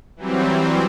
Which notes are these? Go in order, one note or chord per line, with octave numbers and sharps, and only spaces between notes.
E3 F#3 G3 C4